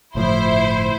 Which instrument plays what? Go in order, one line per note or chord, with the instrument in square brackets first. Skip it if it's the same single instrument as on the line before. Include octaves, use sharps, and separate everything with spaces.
[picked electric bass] G1 A2 F3 [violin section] E4 C5